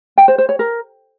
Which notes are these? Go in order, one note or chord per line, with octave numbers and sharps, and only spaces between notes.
G5
C5
C5
C#5
A#4